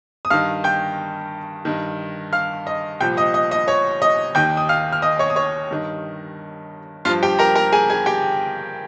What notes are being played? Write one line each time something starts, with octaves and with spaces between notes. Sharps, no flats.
D#6
G2 D#3 F5 F6
G5 G6
G2 D#3
F5 F6
D#5 D#6
C2 A#2 F3 G5 G6
D#5 D#6
D#5 D#6
D#5 D#6
C#5 C#6
D#5 D#6
D#2 D#3 G5 G6
D#6
F5 F6
F6
D#5 D#6
C#5 C#6
D#6
C#5 C#6
G2 D#3
G2 F3 F4 F5
G4 G5
A#4 A#5
A#4 A#5
G#4 G#5
G#4 G#5
G4 G5